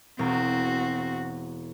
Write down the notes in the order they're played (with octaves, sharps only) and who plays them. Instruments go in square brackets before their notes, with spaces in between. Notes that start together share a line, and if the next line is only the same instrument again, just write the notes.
[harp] E1 A#5 [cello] C4 F#4